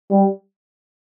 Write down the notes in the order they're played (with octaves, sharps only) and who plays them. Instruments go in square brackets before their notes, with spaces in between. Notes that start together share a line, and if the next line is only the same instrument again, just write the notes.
[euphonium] G3